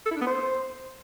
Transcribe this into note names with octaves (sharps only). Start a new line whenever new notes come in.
A4
E4
D4
B3
C5